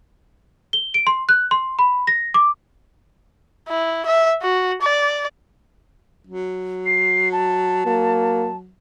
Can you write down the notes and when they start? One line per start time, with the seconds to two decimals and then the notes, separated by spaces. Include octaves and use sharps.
0.73 G7
0.94 D7
1.07 C6
1.29 F#6
1.51 C6
1.79 B5
2.07 A#6
2.34 D6
3.69 E4
4.06 E5
4.42 F#4
4.82 D5
6.27 F#3
6.86 C7
7.32 A5
7.85 F#3 A#3